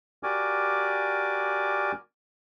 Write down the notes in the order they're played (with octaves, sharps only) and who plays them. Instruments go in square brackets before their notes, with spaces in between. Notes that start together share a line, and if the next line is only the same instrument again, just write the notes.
[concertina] F#4 G4 A#4 D5 G#5 D6